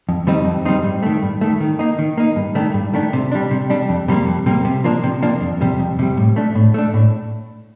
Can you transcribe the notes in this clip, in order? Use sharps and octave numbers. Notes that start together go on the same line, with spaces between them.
F2
D#3 G3 C4 D#4
F2
D#3 G3 C4 D#4
G2
D#3 A3
G2
D#3 A3
D#3
A#3 D#4
D#3
A#3 D#4
G2
D#3 A3 D4
G2
D#3 A3 D4
C3
G3 D4
C3
G3 D4
F2
C3 G3 A#3
F2
C3 G3 A#3
C3
F3 A#3 D4
C3
F3 A#3 D4
F2
C3 G3
F2
C3 G3
A2
A3 D4
A2
A3 D4
A2